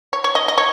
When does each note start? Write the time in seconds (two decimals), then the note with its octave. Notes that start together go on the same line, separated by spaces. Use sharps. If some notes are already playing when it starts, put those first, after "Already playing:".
0.13 C#5
0.24 C#5
0.35 D#5
0.48 D#5
0.58 C#5